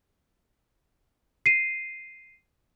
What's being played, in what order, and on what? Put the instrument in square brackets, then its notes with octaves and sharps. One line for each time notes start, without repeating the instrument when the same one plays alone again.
[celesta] C7 D#7